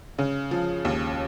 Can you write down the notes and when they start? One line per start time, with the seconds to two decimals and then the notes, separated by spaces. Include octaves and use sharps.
0.18 C#3
0.51 F3
0.85 D#2